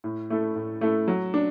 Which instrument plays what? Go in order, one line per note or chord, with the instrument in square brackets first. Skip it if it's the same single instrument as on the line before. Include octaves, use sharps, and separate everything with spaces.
[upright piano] A2
A3 E4 A4
A2
A3 E4 A4
F#3
D4